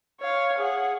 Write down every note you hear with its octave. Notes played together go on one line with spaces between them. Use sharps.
C#5 F5
G#4 F#5